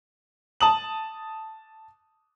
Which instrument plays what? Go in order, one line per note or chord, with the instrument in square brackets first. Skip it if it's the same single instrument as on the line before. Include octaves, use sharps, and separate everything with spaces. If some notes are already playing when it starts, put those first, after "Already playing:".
[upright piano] A5 D#6 F#7